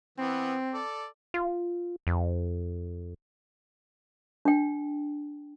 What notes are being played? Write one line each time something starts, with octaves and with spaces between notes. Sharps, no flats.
E3 B3 C4
A4 D5
F4
F2
D4 G5